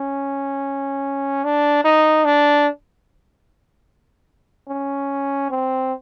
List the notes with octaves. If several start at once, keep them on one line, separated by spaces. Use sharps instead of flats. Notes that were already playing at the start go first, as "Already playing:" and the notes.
Already playing: C#4
D4
D#4
D4
C#4
C4